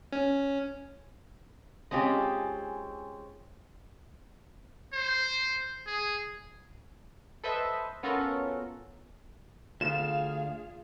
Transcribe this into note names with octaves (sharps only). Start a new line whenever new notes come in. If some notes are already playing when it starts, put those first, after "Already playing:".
C#4
G#3 C4 C#4 F4 G4
C5
G#4
A4 B4 C5 D#5 E5
B3 C#4 F4 F#4 A4 A#4
D2 F4 G#4 F5 E7